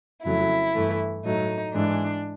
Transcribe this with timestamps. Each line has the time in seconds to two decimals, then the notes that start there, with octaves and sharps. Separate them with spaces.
0.23 F2 C#3 F#3 A3 E4
0.74 G2 E3 A3
1.23 A2 F#3 A3 D#4
1.74 G#2 E3 G#3 D4